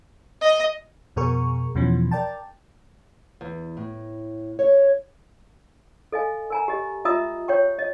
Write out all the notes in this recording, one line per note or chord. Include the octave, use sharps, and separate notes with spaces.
D#5
F2 B2 G#4 A#4 C#6
E2 B2 E3 F3 C#4
A#4 D5 G5 A5
E2
A2
C#5
A4 D#5 F5 G#5
A#4 G#5 A#5
G4 D#5
F4 D#5 E5 A#5 D#6 E6
C#5 G5 C#6
D#5